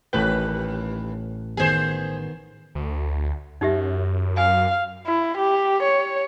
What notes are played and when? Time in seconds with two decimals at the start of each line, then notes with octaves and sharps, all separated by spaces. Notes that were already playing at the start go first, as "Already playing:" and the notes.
0.13 A1 D#2 A2 B4 G5
1.57 D#3 B3 G#4 C5
2.75 D2
3.61 F#2 D#4 G4 E5
4.37 F#2 F5 G#5
5.07 E4
5.38 G4
5.83 C#5